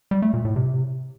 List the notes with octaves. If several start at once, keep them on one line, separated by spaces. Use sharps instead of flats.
G3
A3
A#2
A2
C3